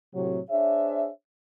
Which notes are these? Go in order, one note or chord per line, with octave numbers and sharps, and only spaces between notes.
A2 C3 F#3
D4 G#4 C5 C#5 E5